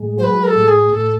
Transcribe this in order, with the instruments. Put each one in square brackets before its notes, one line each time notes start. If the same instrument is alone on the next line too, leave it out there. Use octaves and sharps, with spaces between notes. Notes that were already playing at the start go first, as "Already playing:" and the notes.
Already playing: [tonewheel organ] A2 G#3
[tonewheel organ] F#3 [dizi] C5
[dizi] B4
A#4
A4
[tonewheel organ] A2
[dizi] G#4
[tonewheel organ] A2 [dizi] A4